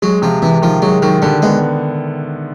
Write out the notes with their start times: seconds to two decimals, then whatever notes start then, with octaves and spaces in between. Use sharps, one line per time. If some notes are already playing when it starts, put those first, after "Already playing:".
0.02 F#3 G#3
0.22 C3 F3
0.42 C3 E3
0.62 D#3 F3
0.82 F#3 G#3
1.02 D#3 F#3
1.22 D3 G3
1.42 G#3 B3